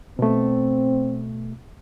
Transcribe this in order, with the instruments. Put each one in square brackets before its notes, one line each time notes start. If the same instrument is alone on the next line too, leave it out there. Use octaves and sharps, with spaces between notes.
[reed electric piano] B2 A3 [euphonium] C4